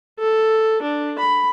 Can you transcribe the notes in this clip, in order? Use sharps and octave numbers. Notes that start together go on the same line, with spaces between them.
A4
D4
B5